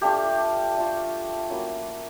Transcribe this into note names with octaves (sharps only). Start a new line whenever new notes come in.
A3 D4 F4 G4
A3 D4 F4
F#3 A#3 C#4 E4